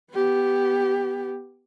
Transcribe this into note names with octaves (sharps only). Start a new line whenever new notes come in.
B3 G4